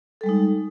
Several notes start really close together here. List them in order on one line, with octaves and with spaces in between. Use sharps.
A4 G3 G#3 D#4